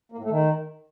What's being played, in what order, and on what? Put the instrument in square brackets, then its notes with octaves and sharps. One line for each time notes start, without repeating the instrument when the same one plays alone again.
[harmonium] A#3
A2
A3
D#3